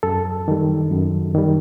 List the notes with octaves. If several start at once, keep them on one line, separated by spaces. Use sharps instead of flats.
F#2 A4
D#3 G3
F#2
D#3 G3